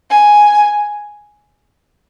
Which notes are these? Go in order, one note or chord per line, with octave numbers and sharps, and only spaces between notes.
G#5